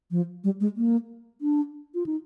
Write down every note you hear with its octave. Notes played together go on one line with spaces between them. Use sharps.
F3
G3
G#3
A#3
D4
F4
D#4